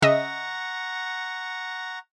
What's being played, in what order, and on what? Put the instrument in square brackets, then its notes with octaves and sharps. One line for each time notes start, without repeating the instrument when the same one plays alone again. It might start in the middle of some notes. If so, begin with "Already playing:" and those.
[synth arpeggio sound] C#3 D#5 E5 [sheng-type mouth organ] F#5 A#5 C#6